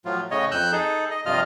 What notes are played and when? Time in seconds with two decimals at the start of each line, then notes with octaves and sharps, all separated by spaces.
0.05 A2 F3 F#3 F4
0.31 A2 C#3 C#5 D#5
0.51 F2 E6 F#6 G6
0.73 D#4 G#4 A4
1.11 D#5
1.26 G2 C3 F3 F4 D#5 F6